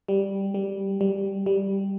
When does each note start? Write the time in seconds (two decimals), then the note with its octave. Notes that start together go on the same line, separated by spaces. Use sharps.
0.08 G3
0.54 G3
1.01 G3
1.46 G3